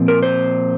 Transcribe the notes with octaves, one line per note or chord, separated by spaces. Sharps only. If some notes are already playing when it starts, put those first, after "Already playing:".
Already playing: A#2 F3 C4
A#4
C5